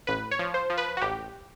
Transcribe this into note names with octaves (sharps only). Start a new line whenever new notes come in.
A1 B4
C#5
F3
C5
F3
B4
F#4
A1 G4